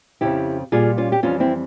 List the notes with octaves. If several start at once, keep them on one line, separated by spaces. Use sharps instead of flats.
F2 C#3 F3 E4 G4
A#2 G3 F4 G#4
C#4 F4
G4
F2 E3 G3 C#4 F4
C4 E4